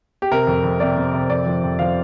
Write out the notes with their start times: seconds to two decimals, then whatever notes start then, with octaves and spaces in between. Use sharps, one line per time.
0.22 G4
0.32 C3 A#4
0.47 F2
0.64 F2
0.80 C3 D5
0.97 C3
1.13 C3
1.30 F2 D5
1.46 F3
1.64 F2
1.79 F3 F5